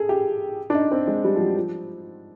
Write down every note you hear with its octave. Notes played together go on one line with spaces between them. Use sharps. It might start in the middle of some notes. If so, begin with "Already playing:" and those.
Already playing: G#4 A4
G4
D4
D#4
C4
G#3
G3
F3
F#3
F3